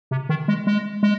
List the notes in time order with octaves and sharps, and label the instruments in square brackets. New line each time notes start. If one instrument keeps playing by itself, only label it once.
[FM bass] C3
D#3
G#3
G#3
G#3